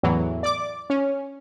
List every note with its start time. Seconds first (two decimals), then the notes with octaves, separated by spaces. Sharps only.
0.03 E2 A2 E3 F#3
0.43 D5 D6
0.90 C#4